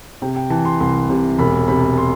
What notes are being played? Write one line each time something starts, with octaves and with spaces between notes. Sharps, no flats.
C3 G5
G5
E3 A5
C6
C2 C6
C3
E1 B5
C3 B5
C6